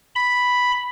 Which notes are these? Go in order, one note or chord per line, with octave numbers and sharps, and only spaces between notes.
B5